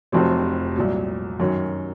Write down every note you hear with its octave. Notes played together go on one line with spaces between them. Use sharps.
F1 F2 C3 F#3 C4
C2 A#2 F#3
F#2 D#3 F#3 C#4